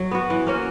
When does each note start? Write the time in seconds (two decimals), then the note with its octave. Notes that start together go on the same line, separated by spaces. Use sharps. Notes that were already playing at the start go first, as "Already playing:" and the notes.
Already playing: F#3
0.11 B3 F#4
0.30 E3
0.47 A#3 C#4 F#4